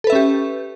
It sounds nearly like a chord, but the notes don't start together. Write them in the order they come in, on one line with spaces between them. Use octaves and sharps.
A4 B4 E5 C#4 G4